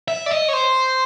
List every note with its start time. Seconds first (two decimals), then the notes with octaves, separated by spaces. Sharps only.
0.08 E5
0.26 D5
0.31 D#5
0.48 C#5
0.53 C5